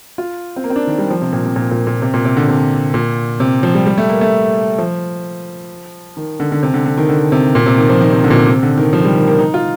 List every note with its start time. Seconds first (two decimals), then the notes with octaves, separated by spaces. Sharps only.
0.18 F4
0.56 C4
0.64 A#3
0.70 C4
0.76 D4
0.87 D#3
0.98 G3
1.10 F3
1.22 C3
1.33 A#2
1.45 C3
1.56 A#2
1.71 A#2
1.87 A#2
2.02 C3
2.14 A#2
2.25 C3
2.37 D3
2.48 C3
2.94 A#2
3.40 C3
3.63 F3
3.75 G3
3.86 G3
3.98 A3
4.09 A#3
4.21 A3
4.78 F3
6.17 D#3
6.40 D3
6.52 D3
6.63 C3
6.74 D3
6.86 D3
6.98 D#3
7.09 D3
7.32 C3
7.55 A#2
7.66 C3
7.78 D#3
7.89 F3
8.01 D#3
8.13 C3
8.24 D3
8.31 A#2
8.36 C3
8.47 C3
8.63 D3
8.78 D#3
8.93 F3
9.05 G3
9.16 D#3
9.28 A#3
9.39 D#4
9.54 F4